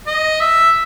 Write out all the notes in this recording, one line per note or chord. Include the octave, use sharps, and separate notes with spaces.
D#5
E5